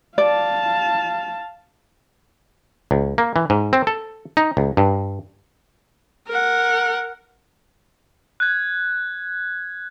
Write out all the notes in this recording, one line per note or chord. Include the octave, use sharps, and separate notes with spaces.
D5 F5 A5
C#2
A#3
E3
G#2
C4
A4
D#4
C#2
G2
A#4 F#5
F#6 G#6